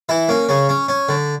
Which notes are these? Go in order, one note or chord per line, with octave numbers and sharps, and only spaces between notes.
E3 E4
A#3 C#4
C#3 C#4
C#4
C#4
D3